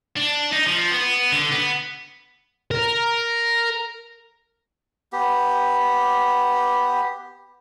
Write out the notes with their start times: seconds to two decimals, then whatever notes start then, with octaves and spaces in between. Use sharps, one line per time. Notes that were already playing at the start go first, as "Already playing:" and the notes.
0.16 D4
0.52 D#4
0.67 F3
0.91 B3
1.33 D3
1.52 B3
2.71 A#4
5.13 B3 G4